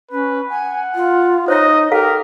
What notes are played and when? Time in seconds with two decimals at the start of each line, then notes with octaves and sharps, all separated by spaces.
0.11 C#4 B4
0.49 F#5 G#5
0.95 F4
1.48 D#4 C5 C#5 D#5 E5
1.92 G4 A4 A#4 F5